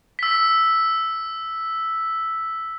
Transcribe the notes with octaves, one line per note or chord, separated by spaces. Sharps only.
E6 B6